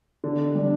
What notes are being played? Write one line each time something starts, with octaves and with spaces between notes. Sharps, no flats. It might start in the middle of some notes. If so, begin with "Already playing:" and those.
D3
G3 D4